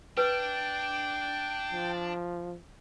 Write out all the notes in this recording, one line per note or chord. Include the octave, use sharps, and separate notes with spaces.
D4 B4 G5
F3